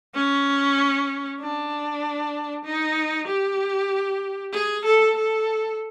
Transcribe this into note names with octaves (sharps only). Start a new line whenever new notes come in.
C#4
D4
D#4
G4
G#4
A4
A4